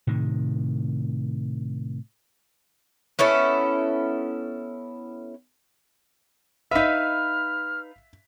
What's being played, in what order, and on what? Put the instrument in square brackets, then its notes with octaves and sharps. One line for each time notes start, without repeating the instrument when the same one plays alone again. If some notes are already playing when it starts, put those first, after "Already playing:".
[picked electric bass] A2 C3 D#3
[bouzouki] B3 C#4 E4 A4
[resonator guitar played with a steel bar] D#4 B4 [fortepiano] E5 [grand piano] F5 B6 [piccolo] F6